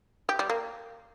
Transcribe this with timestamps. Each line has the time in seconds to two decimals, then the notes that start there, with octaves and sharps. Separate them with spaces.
0.29 G4
0.39 G3
0.50 A#3